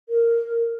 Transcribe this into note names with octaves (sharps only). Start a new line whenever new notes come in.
A#4